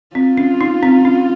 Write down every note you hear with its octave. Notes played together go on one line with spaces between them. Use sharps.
C4 F4
C#4
D#4
C4
C#4